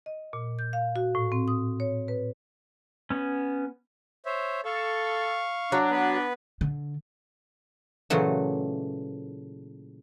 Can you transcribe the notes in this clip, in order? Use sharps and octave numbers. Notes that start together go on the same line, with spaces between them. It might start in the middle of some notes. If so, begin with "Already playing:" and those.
D#5
A#2
G6
F5
F#4
A2
C4
D#6
C#5
B4
B3 C#4
C5 C#5 E5
A4 F5 C#6
F#3 D4
B3 B4
D3
A#2 C#3 E3 F#3 A3